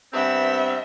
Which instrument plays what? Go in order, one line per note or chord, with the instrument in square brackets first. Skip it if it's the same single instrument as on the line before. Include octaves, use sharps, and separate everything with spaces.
[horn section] G2 B3 C4 [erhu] E5